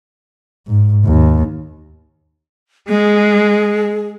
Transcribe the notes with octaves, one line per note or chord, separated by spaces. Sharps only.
G#2
D#2
G#3 G#4